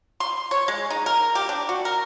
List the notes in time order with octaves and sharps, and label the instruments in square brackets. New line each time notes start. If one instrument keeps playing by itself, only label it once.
[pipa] C6
C#5
G#3
D#4
A#4
G4
D4
F#4
A#4